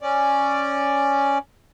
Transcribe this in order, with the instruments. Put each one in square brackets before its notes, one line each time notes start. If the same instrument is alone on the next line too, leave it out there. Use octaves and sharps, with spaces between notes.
[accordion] C#4 D5